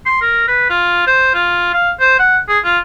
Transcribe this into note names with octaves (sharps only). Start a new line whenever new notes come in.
C6
A#4
B4
F4
C5
F4
F5
C5
F#5
G#4
F4